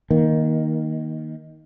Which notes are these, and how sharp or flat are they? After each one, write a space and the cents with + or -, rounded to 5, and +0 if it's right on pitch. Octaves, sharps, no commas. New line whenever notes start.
D#3 +10 A#3 +10